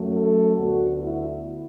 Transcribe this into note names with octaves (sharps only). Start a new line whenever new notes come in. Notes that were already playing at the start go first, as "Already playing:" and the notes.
Already playing: F#2 F#3 A3
A4
D2 D3 B3 F#4
E4